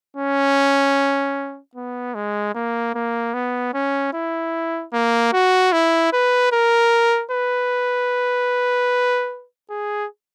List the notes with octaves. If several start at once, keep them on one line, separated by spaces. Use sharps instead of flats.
C#4
B3
G#3
A#3
A#3
B3
C#4
E4
A#3
F#4
E4
B4
A#4
B4
G#4